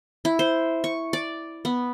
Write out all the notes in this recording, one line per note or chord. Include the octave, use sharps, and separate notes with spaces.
E4
C5
C#6
D5
B3